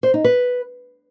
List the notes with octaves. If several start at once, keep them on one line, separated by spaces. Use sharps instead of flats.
C5
D#4
B4